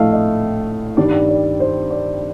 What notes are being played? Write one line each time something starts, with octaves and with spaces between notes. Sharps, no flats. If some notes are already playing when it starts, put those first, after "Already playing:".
Already playing: A#1 A2 A3 D#5 F5
D#5
G2 D#3 G3 D5
D5
C5
D5